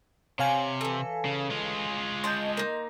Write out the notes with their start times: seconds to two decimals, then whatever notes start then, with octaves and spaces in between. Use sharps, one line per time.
0.39 C3 C#5 F5 G#5
0.81 E3 A4
1.25 C#3
1.50 G#3 F4
2.24 D#5 A5 C6 G6
2.57 A#3 D#4